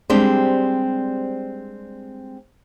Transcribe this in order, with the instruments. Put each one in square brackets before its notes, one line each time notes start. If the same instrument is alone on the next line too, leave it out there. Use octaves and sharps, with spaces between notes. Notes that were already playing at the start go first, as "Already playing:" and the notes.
[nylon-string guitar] G3 G#3 C4 D4 G4 C5